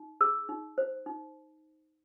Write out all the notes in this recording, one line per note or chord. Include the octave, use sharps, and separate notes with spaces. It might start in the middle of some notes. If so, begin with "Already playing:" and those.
Already playing: D#4
G#4 E6
D#4
C5
D#4